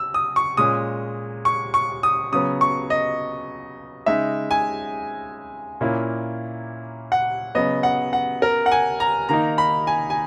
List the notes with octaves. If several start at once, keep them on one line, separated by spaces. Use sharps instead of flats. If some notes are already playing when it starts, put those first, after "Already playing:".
Already playing: E6
D#6
C#6
A#2 G#3 C#4 D#6
C#6
C#6
D#6
C#3 F#3 B3 D#6
C#6
D#5
C#3 G#3 D#4 E5
G#5
A#2 A#3 C#4 E4
F#5
C#3 F#3 B3 D#5
F#5
F#5
A#4
F#5
G#5
A#5
D#3 A#3 D#4 A#5
B5
G#5
G#5